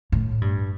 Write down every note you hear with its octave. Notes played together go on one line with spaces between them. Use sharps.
A2
G2